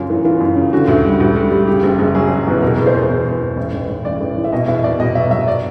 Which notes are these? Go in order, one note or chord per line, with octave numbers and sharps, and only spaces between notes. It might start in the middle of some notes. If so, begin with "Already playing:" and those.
Already playing: F#2 C#3 F4
E3
E3 F4
F#2
C#3
D3 F#4
D2
G3
D2
G3
G3
C#3 G4
F#1
F#1
F#3 G#4
F#3
E2
B2 A#4
E2
C5
E2
E2
E2
E2
A1
A1
A1
A1 D5
A1
E3
E5
B2 D#5
E2 E5
B2 D5
B2 D#5
F#3 E5
F#3 E5
D5